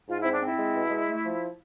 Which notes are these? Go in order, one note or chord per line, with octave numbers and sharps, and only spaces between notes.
G#2 F4
C4 E4
D4
C4 E4
G#3
B2
G#3
A3
F3